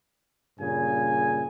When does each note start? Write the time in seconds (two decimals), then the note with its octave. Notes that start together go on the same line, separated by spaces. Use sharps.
0.60 G2 A#2 C#3 G#5